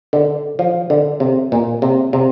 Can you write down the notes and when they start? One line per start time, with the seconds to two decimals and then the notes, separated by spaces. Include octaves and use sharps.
0.13 D3
0.59 F3
0.90 D3
1.20 C3
1.52 A#2
1.82 C3
2.13 C3